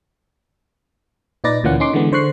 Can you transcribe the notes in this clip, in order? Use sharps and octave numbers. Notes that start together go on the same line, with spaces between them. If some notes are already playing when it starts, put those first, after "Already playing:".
A#2 D#4 B4 D5 A6 A#6
D2 A#2 E3 A#3 C#4 F#5
C#4 D#4 C6 D6
D3 E3 G#3 B3
D3 C5 C#6 F#6 C7